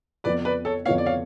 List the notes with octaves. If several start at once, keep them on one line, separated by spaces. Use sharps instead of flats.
F2 F3 B3 B4 D5
B4 D5
A4 C#5
F2 F3 B3 C#5 F5
D5
C#5 F5